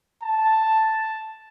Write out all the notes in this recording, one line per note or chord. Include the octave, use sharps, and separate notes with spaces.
A5